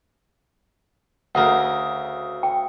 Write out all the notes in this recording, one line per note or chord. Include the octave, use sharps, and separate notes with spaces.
D2 C#3 A#4 F#5
G5